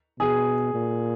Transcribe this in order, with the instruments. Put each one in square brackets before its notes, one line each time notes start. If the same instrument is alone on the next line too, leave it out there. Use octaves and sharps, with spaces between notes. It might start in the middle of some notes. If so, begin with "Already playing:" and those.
[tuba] B2 [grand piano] G#4
[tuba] A#2